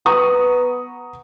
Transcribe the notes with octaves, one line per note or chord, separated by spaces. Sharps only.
B3 A#5 C#6 D#6